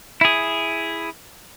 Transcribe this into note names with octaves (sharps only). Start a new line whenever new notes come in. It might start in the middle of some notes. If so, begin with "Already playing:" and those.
E4 G#4